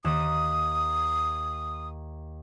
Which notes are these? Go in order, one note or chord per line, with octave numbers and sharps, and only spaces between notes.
D#2 D#3 D#6 E7